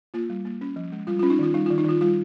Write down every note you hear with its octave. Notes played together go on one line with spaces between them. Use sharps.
A#3 F4
G3
A#3
C#4
F3
G#3
G3 F4
F4
C#4
D#4
D#3 F4
G3 D#4
F4
D#3
D#4
D#3 F4
G3 F4